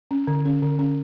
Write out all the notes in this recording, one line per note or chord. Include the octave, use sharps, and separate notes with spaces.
C#4
D3
C#4
D3
C#4